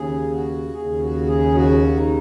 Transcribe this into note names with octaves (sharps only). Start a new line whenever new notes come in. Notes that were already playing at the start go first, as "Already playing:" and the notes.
Already playing: D#2 C#3 G#4
F#4
D#2 C#3 G#4
F#4
G#4
F#4
D#4